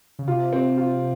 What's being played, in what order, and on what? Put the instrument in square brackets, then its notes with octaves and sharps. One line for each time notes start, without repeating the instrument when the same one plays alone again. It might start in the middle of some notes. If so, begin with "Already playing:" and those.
[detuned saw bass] C#3
[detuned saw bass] C3 [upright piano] F4
[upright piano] C4
F4